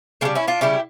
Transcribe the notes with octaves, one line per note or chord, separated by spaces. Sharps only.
C#3 G3 A#3 D4
C#4 E4
D4 F4
C#3 G3 E4 G4